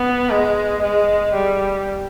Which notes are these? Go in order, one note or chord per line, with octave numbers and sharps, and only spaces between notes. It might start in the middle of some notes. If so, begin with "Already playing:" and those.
Already playing: B3
G#3
G#3
G3